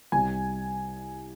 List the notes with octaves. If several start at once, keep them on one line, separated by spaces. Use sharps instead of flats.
C2 C3 G3 G#5